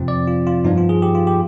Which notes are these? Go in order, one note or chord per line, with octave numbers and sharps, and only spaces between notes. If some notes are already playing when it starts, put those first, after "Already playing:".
Already playing: F2 C3 F3 C4
D5
F4
F4
G2 F3 B3 D#4
F4
G#4
G4
F4
G4